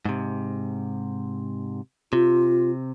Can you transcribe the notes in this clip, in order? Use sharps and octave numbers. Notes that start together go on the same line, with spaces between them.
G#2 C3
C3 F4